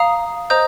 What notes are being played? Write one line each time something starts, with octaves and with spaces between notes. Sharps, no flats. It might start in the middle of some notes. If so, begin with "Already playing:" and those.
Already playing: F5 A#5 D#6
C5 D#5 A#5 D#6 G6